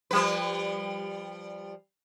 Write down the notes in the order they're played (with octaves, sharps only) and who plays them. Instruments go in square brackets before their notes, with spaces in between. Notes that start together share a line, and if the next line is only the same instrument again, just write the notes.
[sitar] F3 G3 B4